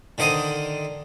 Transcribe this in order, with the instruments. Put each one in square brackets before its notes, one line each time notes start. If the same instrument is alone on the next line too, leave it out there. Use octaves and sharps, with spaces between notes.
[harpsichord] D3 D#3 C5 D#5 D#6